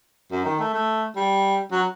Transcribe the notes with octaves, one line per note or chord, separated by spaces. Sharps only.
F#2
D#3
A3
A3
G3
F#3